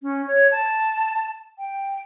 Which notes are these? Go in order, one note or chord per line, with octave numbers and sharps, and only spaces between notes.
C#4
C#5
A5
G5